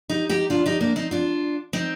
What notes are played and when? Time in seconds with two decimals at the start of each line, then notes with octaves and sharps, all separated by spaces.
0.10 D#4 G4
0.29 D#4 G4
0.50 D4 F4
0.66 D#4 G4
0.81 A#3 D4
0.96 C4 D#4
1.11 D4 F4
1.73 C4 D#4